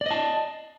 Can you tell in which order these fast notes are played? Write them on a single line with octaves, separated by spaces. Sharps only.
D5 D#5 A5